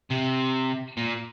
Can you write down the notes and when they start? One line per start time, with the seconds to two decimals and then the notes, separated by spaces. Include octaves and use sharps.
0.10 C3
0.97 A#2